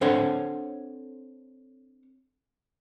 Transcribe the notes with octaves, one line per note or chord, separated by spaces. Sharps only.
C4 D4 A4 C5 C#5 F#5